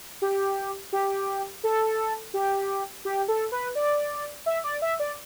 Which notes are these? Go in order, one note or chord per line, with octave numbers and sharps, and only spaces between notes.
G4
G4
A4
G4
G4
A4
B4
D5
E5
D5
E5
D5